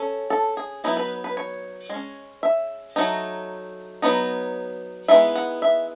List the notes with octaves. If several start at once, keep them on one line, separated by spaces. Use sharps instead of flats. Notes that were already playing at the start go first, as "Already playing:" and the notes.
Already playing: C#4 A4
A4
G#4
F#3 B3 D#4 E4
B4
B4
C#5
G#3 C#4
E5
F#3 A3 D#4
F#3 B3 D#4
E3 G#3 B3 D#4 E5
F#5
E5